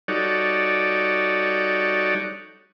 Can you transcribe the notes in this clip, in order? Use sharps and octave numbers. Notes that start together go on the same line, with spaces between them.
G3 D#4 F#4 A4 C#5 D5